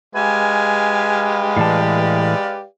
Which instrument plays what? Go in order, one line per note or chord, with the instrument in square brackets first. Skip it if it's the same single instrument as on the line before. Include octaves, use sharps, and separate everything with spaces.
[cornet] G#3 [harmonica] G4 B4 F5 [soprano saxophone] G#5
[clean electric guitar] A2 E3 A5 [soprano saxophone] D5